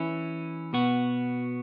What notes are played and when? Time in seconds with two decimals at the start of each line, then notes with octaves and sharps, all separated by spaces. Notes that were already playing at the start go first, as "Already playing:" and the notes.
Already playing: E3 C#4 E4
0.73 B2 B3 F#4